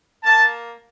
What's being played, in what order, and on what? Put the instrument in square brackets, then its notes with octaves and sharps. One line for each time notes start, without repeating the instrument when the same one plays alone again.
[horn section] A#3 A5